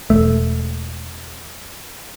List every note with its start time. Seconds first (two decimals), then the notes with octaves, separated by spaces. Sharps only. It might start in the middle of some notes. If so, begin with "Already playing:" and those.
0.10 E1 A3